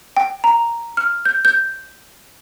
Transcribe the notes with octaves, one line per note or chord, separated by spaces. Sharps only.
G5
A#5
F6
G6
G6